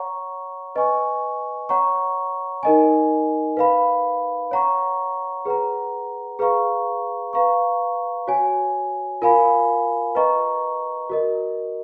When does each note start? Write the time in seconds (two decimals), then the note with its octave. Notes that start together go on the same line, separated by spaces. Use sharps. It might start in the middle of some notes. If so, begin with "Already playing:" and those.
Already playing: C#5 F#5 A#5 C#6
0.75 B4 D#5 G#5 C#6
1.69 C#5 F#5 A#5 C#6
2.63 D#4 A#4 D#5 G#5
3.57 B4 F5 B5
4.51 C#5 F#5 A#5 C#6
5.45 G#4 B4 F#5 A#5
6.39 G#4 B4 F5 A#5 C#6
7.33 B4 F5 A#5 C#6
8.27 F#4 C#5 G#5
9.22 F4 A#4 F5 G#5 B5
10.15 B4 D#5 A#5 C#6
11.10 F#4 A#4 D#5